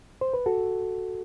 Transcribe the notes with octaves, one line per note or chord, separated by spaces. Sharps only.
C5
B4
F#4 A4